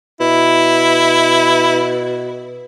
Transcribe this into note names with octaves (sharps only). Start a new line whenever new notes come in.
B2 E4